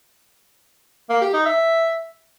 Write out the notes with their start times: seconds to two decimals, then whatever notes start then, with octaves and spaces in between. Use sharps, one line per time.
1.10 A#3
1.22 G4
1.34 D#4
1.46 E5